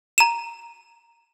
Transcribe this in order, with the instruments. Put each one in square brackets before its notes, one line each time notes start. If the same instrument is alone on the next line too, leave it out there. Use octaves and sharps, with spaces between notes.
[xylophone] A#5 D#7 E7